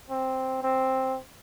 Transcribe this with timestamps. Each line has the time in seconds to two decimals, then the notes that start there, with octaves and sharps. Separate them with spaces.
0.10 C4
0.63 C4